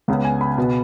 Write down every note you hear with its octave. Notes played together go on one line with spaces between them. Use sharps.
C#2 C#3 B3
G#5
B5
B2 B3